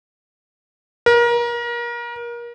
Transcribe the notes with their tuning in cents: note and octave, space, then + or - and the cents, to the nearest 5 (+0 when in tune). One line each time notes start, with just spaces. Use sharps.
A#4 +30